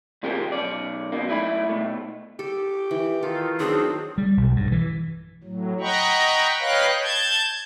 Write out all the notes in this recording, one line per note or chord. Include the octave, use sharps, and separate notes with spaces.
A#2 C#3 F3 A#3 G4 A#4
B1 C3 C#4 D5
B2 D#3 A#3
F#2 A3 E4 D5 B5
B2 A3
G4 A4
E3
D#3 F4 A4
D#3 F#3 C4 D4 G#4
G3
B1
G2
E3
A2 F#3
D#5 F#5 G5 A#5 B5 C#6
B4 C#5 D#5 F5 G5 F#6
A5 G6 G#6